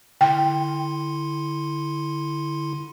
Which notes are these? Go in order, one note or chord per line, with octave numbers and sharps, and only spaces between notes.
D3 E4 G5 C6